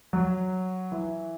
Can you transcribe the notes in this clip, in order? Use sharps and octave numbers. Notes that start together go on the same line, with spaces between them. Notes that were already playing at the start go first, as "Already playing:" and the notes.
F#3
E3